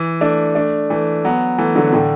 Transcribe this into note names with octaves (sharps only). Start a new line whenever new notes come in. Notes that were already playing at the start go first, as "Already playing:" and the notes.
Already playing: E3
A3 D4
A3 D4
E3 A3
F#3 B3
E3 A3
D3 F#3
A2 D3